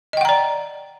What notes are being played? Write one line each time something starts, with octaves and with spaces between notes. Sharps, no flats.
D5 D#5 F#5 G5 A#5